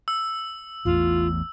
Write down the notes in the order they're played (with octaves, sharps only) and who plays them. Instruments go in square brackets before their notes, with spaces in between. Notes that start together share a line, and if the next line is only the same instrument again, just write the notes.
[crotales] E6
[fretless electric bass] A1 E2 A2 [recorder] F4